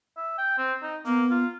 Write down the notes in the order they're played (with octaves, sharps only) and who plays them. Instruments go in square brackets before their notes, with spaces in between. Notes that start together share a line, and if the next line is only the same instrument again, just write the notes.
[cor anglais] E5
G5
C4
D#4
[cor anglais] A#3 [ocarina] B3
[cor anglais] F4